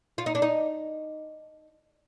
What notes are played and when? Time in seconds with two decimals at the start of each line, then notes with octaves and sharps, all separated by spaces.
0.18 F4
0.26 D#4
0.35 D4
0.42 D#4